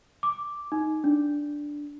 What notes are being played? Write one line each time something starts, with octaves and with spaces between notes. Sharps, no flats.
D6
D#4
D4